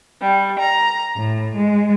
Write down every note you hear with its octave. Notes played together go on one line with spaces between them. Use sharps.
G3
A#5
A2
G#3